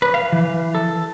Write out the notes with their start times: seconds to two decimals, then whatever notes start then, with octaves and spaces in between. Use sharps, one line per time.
0.02 B4
0.14 F5
0.33 E3
0.75 A4